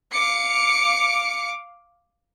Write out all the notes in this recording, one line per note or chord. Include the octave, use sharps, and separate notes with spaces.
F5 D6 C#7